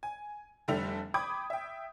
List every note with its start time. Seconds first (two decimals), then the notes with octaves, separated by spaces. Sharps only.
0.03 G#5
0.68 F1 D3 G3 A4 E5 F7
1.14 G5 B5 D6 D#6 G#6 D7
1.50 E5 G5